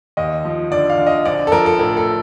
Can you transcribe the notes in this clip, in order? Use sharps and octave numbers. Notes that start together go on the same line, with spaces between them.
D#2 D#5
F3
D3 D5
F5
D3
D#5
A#1 D5
A4
F3 A#4
A4
A2 A#4
A4